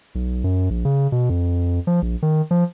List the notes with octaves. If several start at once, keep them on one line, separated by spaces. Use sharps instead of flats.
B1
F#2
A#1
C#3
B2
F2
F3
A#1
D#3
F3